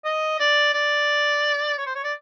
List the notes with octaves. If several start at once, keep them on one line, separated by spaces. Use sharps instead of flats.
D#5
D5
D5
C#5
C5
C#5
D5